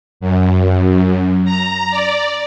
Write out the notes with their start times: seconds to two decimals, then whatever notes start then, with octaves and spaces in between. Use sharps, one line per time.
0.20 F#2
1.45 A#5
1.91 D5